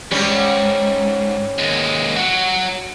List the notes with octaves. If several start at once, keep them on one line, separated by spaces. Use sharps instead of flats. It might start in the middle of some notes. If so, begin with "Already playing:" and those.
D2 G#2 G3 C#4
D#2 G#3
F#3 F#4